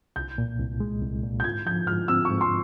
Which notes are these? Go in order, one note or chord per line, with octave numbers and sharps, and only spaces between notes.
C2 G6
A#2
C2
G#3
C2
A#2
G6
G#2 G#6
F3 G6
G#2 F6
C4 E6
C#6
G#2
C6